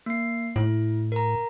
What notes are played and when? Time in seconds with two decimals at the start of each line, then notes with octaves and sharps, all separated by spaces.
0.06 A#3 C7
0.56 A2 E4
1.12 A#4 A#5